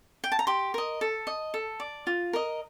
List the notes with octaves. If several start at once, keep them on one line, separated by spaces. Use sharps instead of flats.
G5
A5
A#5
G4 C6
A#4 D#5
A4
D#5
A4
D5
F4
A#4 D#5